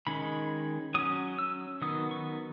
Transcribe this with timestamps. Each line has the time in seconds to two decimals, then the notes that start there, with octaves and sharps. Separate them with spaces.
0.07 D#3 G#3 C#4 B5
0.94 F#3 C#4 D#6
1.38 E6
1.82 D#3 F#3 B3 D#6
2.11 C#6